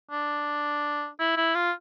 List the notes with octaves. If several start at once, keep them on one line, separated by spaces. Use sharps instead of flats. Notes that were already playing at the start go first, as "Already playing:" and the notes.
D4
E4
E4
F4